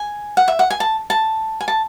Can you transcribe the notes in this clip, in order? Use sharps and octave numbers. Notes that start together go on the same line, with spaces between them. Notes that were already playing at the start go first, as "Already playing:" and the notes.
Already playing: G#5
F#5
E5
F#5
G#5
A5
A5
G#5
A5